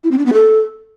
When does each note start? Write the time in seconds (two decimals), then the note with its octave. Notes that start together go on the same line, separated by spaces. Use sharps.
0.04 E4
0.11 C4
0.18 D4
0.26 B3
0.33 A4